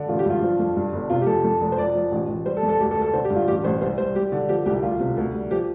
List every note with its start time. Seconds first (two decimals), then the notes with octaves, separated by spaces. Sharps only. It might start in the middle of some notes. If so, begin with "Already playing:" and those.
Already playing: D3
0.08 A1 F4
0.19 G4
0.26 G2 F4
0.42 F3
0.59 F2
0.76 G2
0.93 G1
1.10 C3 F4
1.22 G4
1.27 F2 A4
1.44 F2 A4
1.61 F1
1.72 C5
1.78 F3 D5
1.95 F3
2.12 A1
2.28 A1
2.46 G3 C5
2.57 A4
2.63 F2
2.69 A4
2.80 D2 G4
2.91 A4
2.96 D2
3.02 A4
3.13 D3 C5
3.25 G4
3.30 G2
3.36 F4
3.47 A1 G4
3.64 A1 C5
3.81 C2 C5
3.98 G3 C5
4.15 G3 G4
4.32 D3
4.49 F3 G4
4.66 C2 G4
4.83 D2 F4
5.00 C3
5.17 D2
5.34 G3
5.50 F3 G4